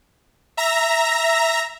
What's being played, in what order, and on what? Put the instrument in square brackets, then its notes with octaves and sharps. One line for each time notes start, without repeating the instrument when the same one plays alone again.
[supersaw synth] E5 A#5 A#6